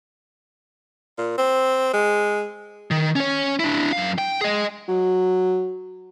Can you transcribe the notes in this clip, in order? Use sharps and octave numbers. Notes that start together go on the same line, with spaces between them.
A#2
C4
G#3
D#3
C#4 C#5
D4 E4
F#2 F5
G5
G#4 D#5
F#3